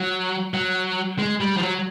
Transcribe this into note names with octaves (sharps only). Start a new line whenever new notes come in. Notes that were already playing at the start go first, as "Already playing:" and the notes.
Already playing: F#3
F#3
G#3
G3
F3
F#3